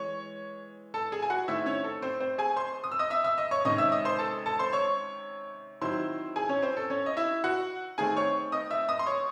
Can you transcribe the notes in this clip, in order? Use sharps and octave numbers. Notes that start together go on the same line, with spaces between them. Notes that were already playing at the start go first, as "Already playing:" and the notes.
Already playing: E3 G#3 C#5 C#6
A4 A5
G#4 G#5
G#5
F#4 F#5
D#3 A3 C4 E4 E5
C#4 C#5
A4
C4 C5
C4 C5
G#4 G#5
C5 C6
D#6
E6
D#5 D#6
E5 E6
E5 E6
D#5 D#6
C#5 C#6
C3 D#3 G#3 C#4 D#5 D#6
E5 E6
D#5 D#6
C5 C6
A4 A5
A4 A5
C5 C6
C#5 C#6
D#3 F#3 C4 E4 C5 C6
G#4 G#5
C#4 C#5
C4 C5
A4
C#4 C#5
D#5
E4 E5
F#4 F#5
D#3 A3 C4 G#4 G#5
C#5 C#6
D#5 D#6
E5 E6
D#5 D#6
C6
C#5 C#6